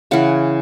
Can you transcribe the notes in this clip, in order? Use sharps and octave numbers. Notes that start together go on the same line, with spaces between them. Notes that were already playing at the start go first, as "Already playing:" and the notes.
C#3 E3 F#5